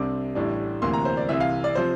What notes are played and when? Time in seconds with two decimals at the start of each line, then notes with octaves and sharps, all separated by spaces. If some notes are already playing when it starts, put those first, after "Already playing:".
Already playing: C2 C3 G3 D4 D6
0.35 A1 A2 E3 G3 D4
0.82 D2 C3 E3 A#3 C6
0.93 A#5
1.05 C5
1.17 D5
1.29 C2 C3 E3 E5
1.40 F5
1.64 D5
1.75 C3 F3 C5